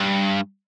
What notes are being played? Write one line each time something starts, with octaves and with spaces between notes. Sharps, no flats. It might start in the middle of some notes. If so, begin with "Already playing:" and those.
Already playing: G2